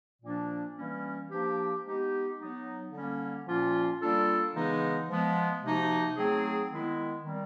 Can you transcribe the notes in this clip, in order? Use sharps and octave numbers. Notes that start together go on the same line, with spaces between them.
A#2 F3 A#3 D4
E3 G3 A#3 C#4
F3 A#3 D4 G4
G#3 B3 D#4 G4
F#3 B3 D#4
D3 G3 A#3 C#4
A#2 F3 A#3 C#4 F4
G3 A#3 D4 F4 A4
C#3 E3 G#3 B3 D#4
F3 G#3 B3
C3 F3 A#3 D#4 F#4
F#3 A3 C4 D#4 G#4
D#3 G#3 B3 E4
D#3 G3 C4